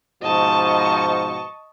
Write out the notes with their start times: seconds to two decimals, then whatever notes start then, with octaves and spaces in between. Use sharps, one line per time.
0.23 G#2 B2 F3 D#5 A5 C#6